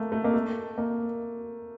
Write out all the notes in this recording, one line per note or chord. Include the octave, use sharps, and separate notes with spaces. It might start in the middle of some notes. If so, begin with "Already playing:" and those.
Already playing: A3 A#3
A3
A#3
A3
A#3